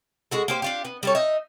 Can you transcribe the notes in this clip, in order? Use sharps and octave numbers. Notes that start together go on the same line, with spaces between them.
G#3 F#4 A4
A#3 G4 C5
D4 F4 G4
B3
G3 A4 C#5
D#4 D#5 E5